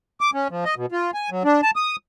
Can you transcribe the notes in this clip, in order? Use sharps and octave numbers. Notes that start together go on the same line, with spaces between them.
D6
C#4
F3
D#5
B2
F4
G#5
F#3
D4
A5
D#6